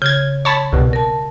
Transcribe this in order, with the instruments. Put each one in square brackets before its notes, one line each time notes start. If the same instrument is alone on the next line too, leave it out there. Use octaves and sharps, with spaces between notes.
[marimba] C#3 [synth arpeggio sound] G6 G#6
[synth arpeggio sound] C#5 A5 B5
C2 B2
[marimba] A#4 A5